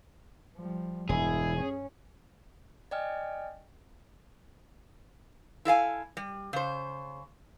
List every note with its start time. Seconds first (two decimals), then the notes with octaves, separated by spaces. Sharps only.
0.56 F3 G3
1.09 E1 G2 E4 G#4
1.57 C#4
2.91 D5 D#5 G5 G#5 F6
5.65 E4 A4 F5 G#5
6.17 G3
6.53 C#3 C5